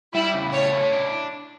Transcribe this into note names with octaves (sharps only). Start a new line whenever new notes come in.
G3 E4
C#3
A3 C#5
E4
D4